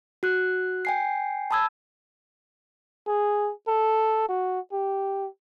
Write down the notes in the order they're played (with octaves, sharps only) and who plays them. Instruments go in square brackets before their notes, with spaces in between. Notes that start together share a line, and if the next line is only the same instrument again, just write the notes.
[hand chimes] F#4 F#6
G5 G#5 C7
A5 B5 D#6 E6 G#6
[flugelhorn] G#4
A4
F#4
G4